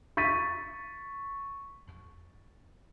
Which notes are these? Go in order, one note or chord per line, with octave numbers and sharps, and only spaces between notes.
C#6 A6 B6 D#7